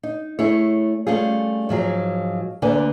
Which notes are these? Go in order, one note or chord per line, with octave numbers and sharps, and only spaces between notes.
D#4
A3 E4 G#4 C#5
G3 A3 C#4 F4 G#4
G#2 F3 F#3 G#4
D2 D3 A#3 D4 B4 G#5